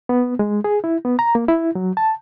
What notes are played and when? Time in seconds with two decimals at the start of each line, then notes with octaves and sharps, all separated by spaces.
0.09 B3
0.39 G#3
0.64 G#4
0.84 E4
1.05 B3
1.19 A#5
1.35 A#3
1.48 E4
1.75 F#3
1.97 A5